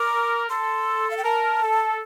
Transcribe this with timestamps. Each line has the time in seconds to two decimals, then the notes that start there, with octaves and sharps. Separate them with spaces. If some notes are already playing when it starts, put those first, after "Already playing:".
Already playing: A#4 D6
0.49 A4 C6
1.11 F5
1.17 G5
1.24 A#4 A5
1.62 A4